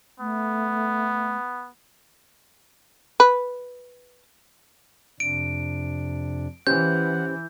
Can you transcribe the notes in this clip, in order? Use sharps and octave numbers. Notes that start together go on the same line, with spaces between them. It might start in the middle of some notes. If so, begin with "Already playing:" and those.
A3 B3
B4
F2 C3 D4 D7
E3 C#4 G4 C5 F#5 G6